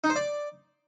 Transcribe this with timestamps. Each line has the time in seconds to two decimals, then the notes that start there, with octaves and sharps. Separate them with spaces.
0.04 D#4
0.10 C5
0.16 D5